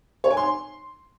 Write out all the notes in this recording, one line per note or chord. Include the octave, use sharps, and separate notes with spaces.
C#5
G#5
C6